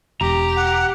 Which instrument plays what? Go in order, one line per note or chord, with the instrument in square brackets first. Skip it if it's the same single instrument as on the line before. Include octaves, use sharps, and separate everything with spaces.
[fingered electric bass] E1 [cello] G4 [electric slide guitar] A#5
[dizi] F#5